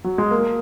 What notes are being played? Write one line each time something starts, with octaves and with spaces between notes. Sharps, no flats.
F#3
G#3
A#3